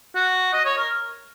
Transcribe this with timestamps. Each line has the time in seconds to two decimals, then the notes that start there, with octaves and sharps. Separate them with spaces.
0.15 F#4
0.53 D#5
0.65 C#5
0.77 A#4